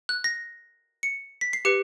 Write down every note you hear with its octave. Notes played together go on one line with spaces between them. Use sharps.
F#6
A#6
C#7
B6
C7
G4 B4 C#7